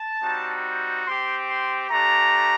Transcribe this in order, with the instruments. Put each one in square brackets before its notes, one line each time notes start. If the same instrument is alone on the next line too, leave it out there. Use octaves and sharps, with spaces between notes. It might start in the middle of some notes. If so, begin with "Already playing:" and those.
Already playing: [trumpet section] A5
G3 C4 D#4 F#4
C4 G4 C6
C6
A3 D4 G4 A#5